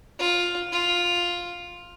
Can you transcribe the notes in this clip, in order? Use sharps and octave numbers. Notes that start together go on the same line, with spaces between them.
F4
F4